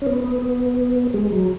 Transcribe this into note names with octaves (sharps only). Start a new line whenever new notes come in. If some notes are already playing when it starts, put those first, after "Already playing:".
C#4
B3
B3
B3
G#3
F#3